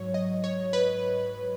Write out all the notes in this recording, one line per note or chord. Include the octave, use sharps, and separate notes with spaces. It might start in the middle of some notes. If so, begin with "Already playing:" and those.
Already playing: G#2 F#3 C#5
D#5
C#5
B4